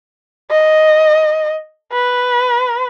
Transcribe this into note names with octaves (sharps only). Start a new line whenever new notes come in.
D#5
B4